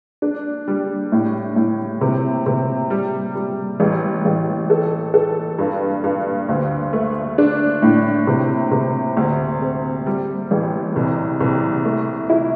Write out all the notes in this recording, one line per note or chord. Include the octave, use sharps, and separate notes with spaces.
D4
G3
A2
A2
C3
C3
G3
G3
A1
A1
A4
A4
G2
G2
D2
A3
D4
A2
C3
C3
D2
C4
G3
A1
C2
C2
A3
E4